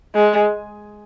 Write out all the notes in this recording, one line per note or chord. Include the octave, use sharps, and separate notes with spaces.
G#3